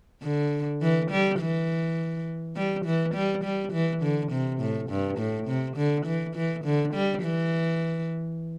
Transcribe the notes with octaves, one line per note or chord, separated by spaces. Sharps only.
D3
E3
G3
E3
G3
E3
G3
G3
E3
D3
C3
A2
G2
A2
C3
D3
E3
E3
D3
G3
E3